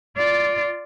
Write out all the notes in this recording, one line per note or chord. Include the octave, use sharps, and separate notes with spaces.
F4 D5